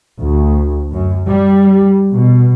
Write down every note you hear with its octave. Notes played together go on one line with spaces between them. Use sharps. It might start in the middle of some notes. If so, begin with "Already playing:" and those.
D2
F#2
G3
B2